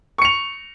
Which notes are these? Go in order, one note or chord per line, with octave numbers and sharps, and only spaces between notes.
C#6 C#7 F7